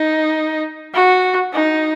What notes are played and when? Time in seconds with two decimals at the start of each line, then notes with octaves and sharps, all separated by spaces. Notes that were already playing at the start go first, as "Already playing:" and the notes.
Already playing: D#4
0.94 F#4
1.53 D#4